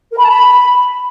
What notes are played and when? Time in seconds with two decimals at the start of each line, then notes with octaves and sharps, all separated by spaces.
0.12 A#4
0.17 B5
0.23 A5
0.28 B5